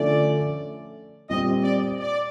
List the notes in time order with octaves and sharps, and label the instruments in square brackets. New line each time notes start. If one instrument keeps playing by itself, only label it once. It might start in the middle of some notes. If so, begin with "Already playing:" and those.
Already playing: [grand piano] D3 F3 A3 C#4 [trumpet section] D5
[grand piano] A#2 G3 C4 [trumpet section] D#5
[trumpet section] D5
D5